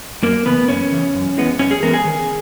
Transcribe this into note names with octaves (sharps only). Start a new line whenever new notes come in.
F#2 A#3 A#4
C#3 E3 B3 B4
F#2 C#4 C#5
C#3 E3
F#2
E3 G#3 B3
F#2 C#4 C#5
G#4
E3 G#3 B3 A#4
G#4 G#5
D#3